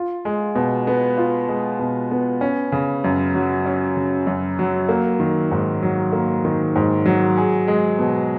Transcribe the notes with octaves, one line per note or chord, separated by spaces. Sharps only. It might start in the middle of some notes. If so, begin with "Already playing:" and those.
Already playing: F4
G#3
B2
B3
F4
G#3
B2
B3
C#4
C#3
F#2
F#3
C#4
C#3
F#2
F#3
A#3
D#3
G#2
F#3
A#3
D#3
G#2
F#3
G#4
G#3
B2